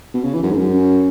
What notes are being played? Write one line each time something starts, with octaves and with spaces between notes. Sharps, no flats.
B2
C#3
E3
F#2
G#2
F#2
C#4